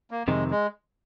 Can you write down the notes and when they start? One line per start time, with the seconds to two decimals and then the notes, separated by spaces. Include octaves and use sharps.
0.11 A#3
0.28 F2 C3 D#3 G#3
0.51 G#3